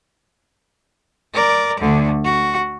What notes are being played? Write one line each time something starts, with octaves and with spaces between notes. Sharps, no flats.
A#4 D5
D2 D3
F#4